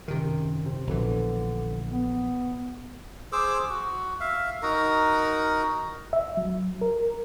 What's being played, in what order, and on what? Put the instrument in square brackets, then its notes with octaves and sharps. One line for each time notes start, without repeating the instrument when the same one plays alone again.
[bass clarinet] F#2 [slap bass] C3 D#3
[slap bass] C3
[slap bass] A#1 B2 E3 [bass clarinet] D3
[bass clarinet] B3
[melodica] G#4 C5 D6 E6
F#4
E5 F5
D#4 F#4 A#4 A#5
[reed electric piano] E5
F#3
A#4